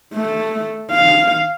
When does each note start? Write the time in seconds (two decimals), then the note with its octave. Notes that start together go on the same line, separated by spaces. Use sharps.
0.14 A3
0.91 F5